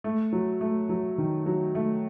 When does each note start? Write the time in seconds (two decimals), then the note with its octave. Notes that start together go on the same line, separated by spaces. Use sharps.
0.04 A3
0.33 F#3
0.61 A3
0.89 F#3
1.18 D#3
1.46 F#3
1.75 A3